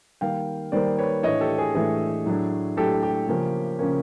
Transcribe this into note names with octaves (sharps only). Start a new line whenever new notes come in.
D#3 G3 A#3 F5 G5
D#3 G3 A#3 C5 D5
B4 C#5
A2 E3 A3 D4 C#5 D#5
G4 A4
G#4
A2 E3 A3 D4 G#4
A2 F#3 A3 D4
A2 F#3 A3 D4 G4 A4
G4
C#3 F3 A#3 C#4
C#3 F3 A#3 C#4